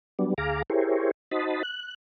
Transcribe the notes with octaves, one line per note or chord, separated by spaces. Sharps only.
F#3 G3 B3 D4
D2 G#4 F5 A#5 D6
E4 G4 G#4 A#4 C5 C#5
D#4 F#4 C5 D#5 A5 B5
F#6